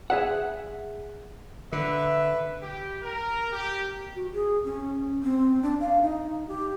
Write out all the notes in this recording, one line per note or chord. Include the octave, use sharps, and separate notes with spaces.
G#4 E5 F#5
D3 B4 E5
G4
A#4
G4
F#4
G#4
C#4
C4
D4
F5
D#4
G4